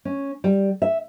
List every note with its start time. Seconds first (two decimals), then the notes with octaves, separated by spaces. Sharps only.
0.05 C#4
0.44 G3
0.82 E5